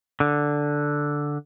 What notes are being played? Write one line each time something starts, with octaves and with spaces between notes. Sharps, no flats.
D3